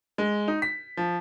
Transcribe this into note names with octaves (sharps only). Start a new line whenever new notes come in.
G#3
D#4
B6
F3